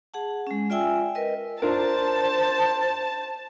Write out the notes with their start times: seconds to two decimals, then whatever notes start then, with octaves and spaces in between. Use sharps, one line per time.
0.14 G#4 F#5 A5
0.47 G#3 C#4
0.70 F4 D5 E5 G5 G#5 E6
1.15 A#4 B4 D#5
1.62 D4 F4 A#4 C5 A5